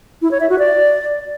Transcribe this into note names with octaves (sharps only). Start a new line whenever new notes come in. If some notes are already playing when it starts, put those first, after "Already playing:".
E4
C#5
E5
F#4
D5